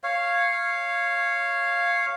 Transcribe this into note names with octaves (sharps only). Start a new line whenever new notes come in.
C#5 F5